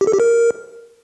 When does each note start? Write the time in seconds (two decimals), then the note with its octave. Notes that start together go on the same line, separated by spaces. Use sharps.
0.01 G4
0.07 A4
0.13 G4
0.20 A#4